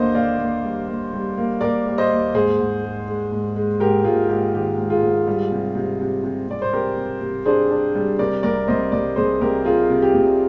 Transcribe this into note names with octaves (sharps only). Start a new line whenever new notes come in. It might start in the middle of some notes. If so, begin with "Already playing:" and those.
Already playing: D#2 D3 A#3 C5 D#5
A#3 D5 F5
A#3
G3
A#3
G3
A#3
A#3 A#4 D5
G3
C5 D#5
D#2
G#2 G#4 C5
G#2
G#3
G#3
G#2
G#3
G#2 G4 A#4
G#2 F4 G#4
G#2 G4
D#3 G4
G#2
F4 G#4
G#2
G3
C3
C3
C3
C3
C3 D5
C5
C3 G4 A#4
C3
C3
D4 G#4 C5
D4
G3
C3 A#4 D5
C2 A#4 D5
C2 C5 D#5
C2 A#4 D5
C2 G#4 C5
C2 G4 A#4
C3 F4 G#4
C3
G4
C2